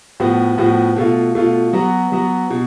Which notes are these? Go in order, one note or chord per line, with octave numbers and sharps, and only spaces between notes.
A2 F3 B3 F#4
A2 F3 B3 F#4
B2 A3 F4
B2 A3 F4
F#3 B3 F#4
F#3 B3 F#4
B2